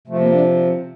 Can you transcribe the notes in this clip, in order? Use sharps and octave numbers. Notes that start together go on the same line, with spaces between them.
C3 F3 A3
A#3
D4